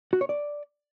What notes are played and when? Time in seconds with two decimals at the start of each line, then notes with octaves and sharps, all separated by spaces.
0.13 F#4
0.21 C#5
0.29 D5